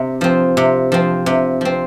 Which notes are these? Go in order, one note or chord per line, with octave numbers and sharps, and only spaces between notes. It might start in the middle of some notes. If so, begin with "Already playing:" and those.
Already playing: C3
F3 C4
C3
F3 C4
C3
F3 C4